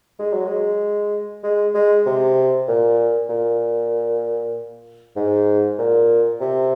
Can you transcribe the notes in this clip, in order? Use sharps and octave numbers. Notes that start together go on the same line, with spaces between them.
G#3
F#3
G#3
G#3
G#3
C3
A#2
A#2
G#2
A#2
C3